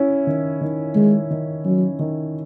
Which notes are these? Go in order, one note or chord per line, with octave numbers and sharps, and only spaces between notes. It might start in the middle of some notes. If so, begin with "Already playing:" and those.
Already playing: C#4 E4
D#3
D#3
D#3 G#3
D#3
F#3 C#4
D#3